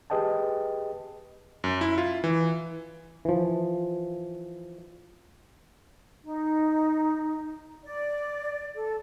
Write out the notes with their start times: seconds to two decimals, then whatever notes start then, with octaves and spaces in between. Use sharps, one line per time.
0.10 G4 G#4 B4 D#5 G5 A5
1.64 F#2
1.81 E4
1.98 F4
2.24 E3
3.25 E3 F3
6.23 D#4
7.84 D5
8.75 A4